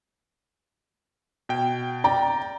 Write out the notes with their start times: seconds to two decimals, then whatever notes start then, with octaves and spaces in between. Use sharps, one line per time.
1.49 B2 G5
2.04 D5 G5 A#5